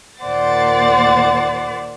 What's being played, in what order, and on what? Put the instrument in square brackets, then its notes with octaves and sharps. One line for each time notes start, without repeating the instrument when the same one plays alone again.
[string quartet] D#2 A#2 C5 D5 F#5 A6